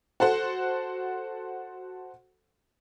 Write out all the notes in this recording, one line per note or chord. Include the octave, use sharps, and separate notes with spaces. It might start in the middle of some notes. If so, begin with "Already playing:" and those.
F#4 A4 C5 F#5